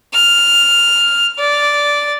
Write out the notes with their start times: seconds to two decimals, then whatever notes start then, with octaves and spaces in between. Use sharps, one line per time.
0.13 F6
1.38 D5